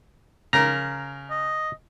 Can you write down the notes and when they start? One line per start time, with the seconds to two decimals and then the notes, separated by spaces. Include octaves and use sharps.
0.53 C#3 A#4 A#5
1.30 D#5